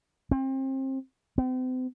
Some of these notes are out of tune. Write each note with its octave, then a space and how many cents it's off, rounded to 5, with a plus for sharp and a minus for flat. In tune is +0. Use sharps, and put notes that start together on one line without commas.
C4 +30
C4 -40